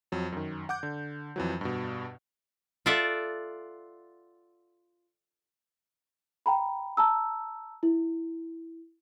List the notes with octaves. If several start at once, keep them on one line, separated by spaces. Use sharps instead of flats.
F2 F#3
F#2 D#3
F#5 D6 G6
D3
F2 E3 F#3
G2 B2
F4 A4 D5 E5 F#5
G5 A#5 B5
A5 A#5 E6
E4